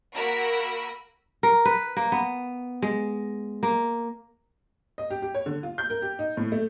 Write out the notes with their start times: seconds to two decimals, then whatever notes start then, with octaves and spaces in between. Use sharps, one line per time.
0.13 A#3 F#4 A#4 B5 E6
1.43 A#4
1.65 B4
1.97 A#3
2.12 B3
2.82 G#3
3.63 A#3
4.98 D#5
5.10 G4
5.22 G4
5.34 C#5
5.46 D3
5.63 F4
5.78 G6
5.90 A#4
6.02 G4
6.19 D#4
6.37 A2
6.52 A3